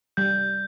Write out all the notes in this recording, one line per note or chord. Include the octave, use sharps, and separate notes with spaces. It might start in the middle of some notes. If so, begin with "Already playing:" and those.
G3 G6